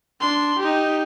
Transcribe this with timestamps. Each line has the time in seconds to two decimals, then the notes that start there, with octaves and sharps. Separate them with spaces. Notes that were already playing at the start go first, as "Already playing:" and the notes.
0.21 D4 C6
0.58 D#4 G4